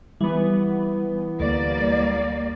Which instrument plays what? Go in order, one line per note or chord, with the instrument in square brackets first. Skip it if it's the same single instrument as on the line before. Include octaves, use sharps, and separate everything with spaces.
[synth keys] E3 B3 [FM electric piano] G3
[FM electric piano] D2 [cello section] G3 A#3 D5